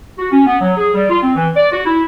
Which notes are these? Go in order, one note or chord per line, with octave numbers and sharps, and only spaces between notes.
F#4
C#4
B3
F#3
G#4
G3
F4
C4
E3
D5
F#4
E4